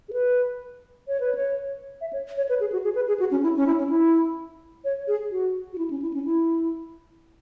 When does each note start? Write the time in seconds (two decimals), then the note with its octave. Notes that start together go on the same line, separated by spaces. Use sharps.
0.09 G#4
0.13 B4
1.08 C#5
1.20 B4
1.35 C#5
2.01 E5
2.13 C#5
2.37 C#5
2.49 B4
2.60 G#4
2.72 F#4
2.84 G#4
2.95 B4
3.08 G#4
3.20 F#4
3.31 C#4
3.43 E4
3.56 C#4
3.67 E4
3.78 C#4
3.89 E4
4.85 C#5
5.08 G#4
5.31 F#4
5.73 F#4
5.78 E4
5.90 C#4
6.02 E4
6.14 C#4
6.25 E4